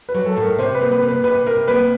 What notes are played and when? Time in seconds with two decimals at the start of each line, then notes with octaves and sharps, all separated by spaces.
0.09 B4
0.14 F#3
0.26 A4
0.36 A2
0.42 A#4
0.59 C3 C5
0.75 B4
0.81 A#3
0.91 B4
1.02 A#3
1.08 B4
1.24 C3 B4
1.46 C3 A#4
1.68 A#3 B4